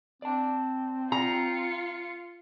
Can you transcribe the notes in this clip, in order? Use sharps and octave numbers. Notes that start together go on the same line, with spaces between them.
C4 D5 A5
F4 A#5 C#7